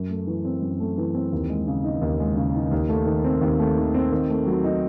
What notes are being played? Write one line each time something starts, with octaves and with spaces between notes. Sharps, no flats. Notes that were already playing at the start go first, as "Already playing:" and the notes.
Already playing: F#2
A3
E3
C4
F#2
A3
E3
C4
D#2
G#3
C#3
D#4
D#2
G#3
C#3
D#4
D#2
A3
D#3
C4
D#2
A3
D#3
C4
D#3
A3
F#3
D#4